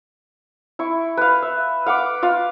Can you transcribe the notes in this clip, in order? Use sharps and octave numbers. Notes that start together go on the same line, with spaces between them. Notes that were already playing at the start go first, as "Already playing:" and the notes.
E4 C#6
B4 F5
E5
F5 F#5 B5 D6
F4 F5